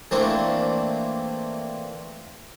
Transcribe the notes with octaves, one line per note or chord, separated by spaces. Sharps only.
E3 A3 A#3 C4 D4